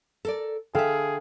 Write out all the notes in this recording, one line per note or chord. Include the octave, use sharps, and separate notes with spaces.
A4 A#4 D5
D3 G#4 A4 E5 F5 G5